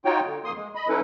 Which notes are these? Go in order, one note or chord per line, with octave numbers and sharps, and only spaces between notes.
D#4 F4 F#4 C#5 G5
D3
F2 A#3 C6 D#6
G#3
D#5 B5
F#3 C#4 D#4 E4 A4 B4